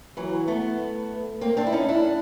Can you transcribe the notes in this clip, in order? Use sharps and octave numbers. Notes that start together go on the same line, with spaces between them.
E3 F#3
A3 B3
A#3 C4
C4 D4
E4
C#4 D#4
D4 E4